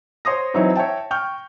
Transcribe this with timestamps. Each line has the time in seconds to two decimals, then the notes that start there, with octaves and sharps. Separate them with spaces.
0.25 C5 C#5 C6 D#6 A#6
0.54 E3 F#3 C4 D#4 C#5 E5
0.75 C#5 E5 G5 A5
1.11 G5 C#6 F6 G6